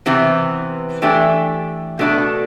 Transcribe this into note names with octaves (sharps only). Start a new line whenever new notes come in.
C3 E3 B3
E3 A3 D4 G4
B2 A3 D4 F#4 A4